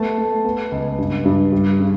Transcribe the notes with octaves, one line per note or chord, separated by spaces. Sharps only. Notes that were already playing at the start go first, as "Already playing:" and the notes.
Already playing: A3 B3 A5
A3
B3
C#2
G2
G2
G3
C#3